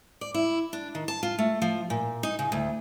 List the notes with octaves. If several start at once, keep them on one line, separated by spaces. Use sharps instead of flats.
D5
E4
D4
D#3
A5
F4
A3
F3
A#2
D#4
C#3
D2